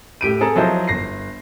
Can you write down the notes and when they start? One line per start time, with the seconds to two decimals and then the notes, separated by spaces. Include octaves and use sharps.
0.21 A2 G4 D7 D#7
0.40 C4 G#4 A4 A5 A#5
0.56 F3 F#3 E4 C5 D#5
0.88 G1 A#6 C7